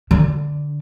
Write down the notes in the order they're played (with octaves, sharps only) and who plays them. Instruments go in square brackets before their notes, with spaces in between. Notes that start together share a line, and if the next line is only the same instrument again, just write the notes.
[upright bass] D3